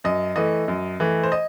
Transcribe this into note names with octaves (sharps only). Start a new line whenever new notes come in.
F#2 D#5
E3 A3 D#5
F#2
E3 A3
C5
D#5